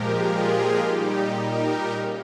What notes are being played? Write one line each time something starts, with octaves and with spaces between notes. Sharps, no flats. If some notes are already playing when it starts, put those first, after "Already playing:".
Already playing: A#2 F3 G#3 G4 A#4
F4 G#4
A#2 G3 D#4 G4
G4 A#4
C#3